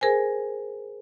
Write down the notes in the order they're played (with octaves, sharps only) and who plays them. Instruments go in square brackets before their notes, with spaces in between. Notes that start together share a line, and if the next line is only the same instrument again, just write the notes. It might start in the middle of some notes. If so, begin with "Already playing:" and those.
[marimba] G#4 A#4 C5 G#5